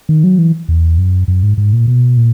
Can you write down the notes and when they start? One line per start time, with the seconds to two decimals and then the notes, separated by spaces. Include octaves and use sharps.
0.09 D#3
0.24 F#3
0.39 E3
0.69 E2
0.98 F#2
1.28 F#2
1.43 G#2
1.58 G#2
1.73 A#2
1.88 B2
2.17 A#2